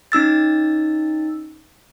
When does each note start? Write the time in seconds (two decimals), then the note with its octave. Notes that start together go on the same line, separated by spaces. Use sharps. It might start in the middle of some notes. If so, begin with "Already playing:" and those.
0.12 C#4 D#4 E6 A6